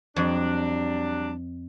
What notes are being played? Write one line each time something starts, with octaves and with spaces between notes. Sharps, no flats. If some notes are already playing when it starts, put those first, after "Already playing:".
F2 F#3 G3 D4